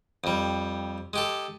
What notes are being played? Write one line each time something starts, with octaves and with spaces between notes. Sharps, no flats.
F2 G3
G#3 G4 A4